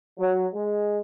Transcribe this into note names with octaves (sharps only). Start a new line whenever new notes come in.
F#3
G#3